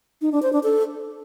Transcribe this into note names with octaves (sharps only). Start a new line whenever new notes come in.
D#4
D4
C5
D4
A4